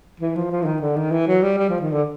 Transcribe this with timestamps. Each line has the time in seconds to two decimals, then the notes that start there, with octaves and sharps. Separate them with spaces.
0.20 E3
0.35 F3
0.51 F3
0.62 E3
0.65 D#3
0.81 D3
0.96 D#3
1.12 E3
1.27 F#3
1.42 G3
1.58 G3
1.69 F3
1.80 D#3
1.92 D3